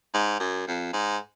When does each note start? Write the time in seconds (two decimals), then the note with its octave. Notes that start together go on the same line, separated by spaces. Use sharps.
0.14 G#2
0.40 F#2
0.67 F2
0.93 G#2